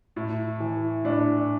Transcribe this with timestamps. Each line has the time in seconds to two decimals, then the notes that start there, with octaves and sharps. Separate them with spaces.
0.16 A2
0.60 E3
1.05 A2 D4